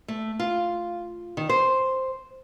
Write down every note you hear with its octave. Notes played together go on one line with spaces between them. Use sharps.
A3
F4
D#3
C5